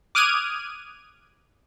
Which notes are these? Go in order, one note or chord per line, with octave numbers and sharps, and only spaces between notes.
D6 D#6 F6 F#6 G#6 D#7